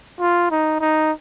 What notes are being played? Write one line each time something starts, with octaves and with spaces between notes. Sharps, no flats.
F4
D#4
D#4